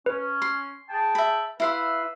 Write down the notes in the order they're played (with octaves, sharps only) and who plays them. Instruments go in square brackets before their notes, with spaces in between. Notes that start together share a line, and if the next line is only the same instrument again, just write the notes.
[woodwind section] C#4 [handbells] B4
[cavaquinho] C6
[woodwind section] G#4 G5 A5
[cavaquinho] E5 B5
[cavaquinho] E4 F5 C6 [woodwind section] B4 E5